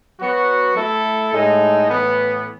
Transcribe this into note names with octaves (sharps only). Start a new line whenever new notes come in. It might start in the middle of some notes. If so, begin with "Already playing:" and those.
F#3 B3 F#4
A3 E4 A4
A2 G#3 D#4 A4
A2 E3 B3